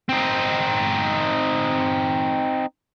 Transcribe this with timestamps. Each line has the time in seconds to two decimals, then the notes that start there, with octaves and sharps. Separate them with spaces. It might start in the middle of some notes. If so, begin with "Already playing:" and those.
0.09 C4 D#4